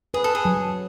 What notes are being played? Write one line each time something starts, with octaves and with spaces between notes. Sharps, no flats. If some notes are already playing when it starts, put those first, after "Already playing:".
G#4 B4
A4
G#4
F#3